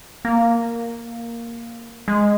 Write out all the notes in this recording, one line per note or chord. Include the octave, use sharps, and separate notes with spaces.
A#3
G#3